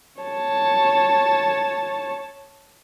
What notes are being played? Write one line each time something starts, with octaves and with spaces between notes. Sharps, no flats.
C#5 A5